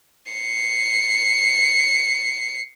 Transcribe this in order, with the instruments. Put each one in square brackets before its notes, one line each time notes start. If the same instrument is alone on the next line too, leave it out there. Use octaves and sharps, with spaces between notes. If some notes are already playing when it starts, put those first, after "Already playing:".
[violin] C7 C#7